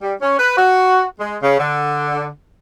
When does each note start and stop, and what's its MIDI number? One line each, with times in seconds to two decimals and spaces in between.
0.02 0.14 55
0.21 0.33 61
0.38 0.56 71
0.57 1.04 66
1.19 1.36 56
1.41 1.58 49
1.59 2.27 50